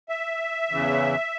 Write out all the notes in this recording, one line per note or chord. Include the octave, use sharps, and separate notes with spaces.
E5
E2 C#3 E3